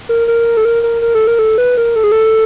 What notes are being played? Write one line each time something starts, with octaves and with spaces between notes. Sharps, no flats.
A#4
A#4
A4
A#4
A#4
A#4
A4
A#4
A4
B4
A#4
A4
G#4
A4